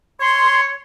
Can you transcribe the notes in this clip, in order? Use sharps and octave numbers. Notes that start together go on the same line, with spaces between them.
C#5 C6